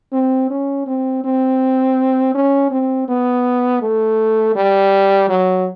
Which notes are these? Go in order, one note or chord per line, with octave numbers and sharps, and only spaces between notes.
C4
C#4
C4
C4
C#4
C4
B3
A3
G3
F#3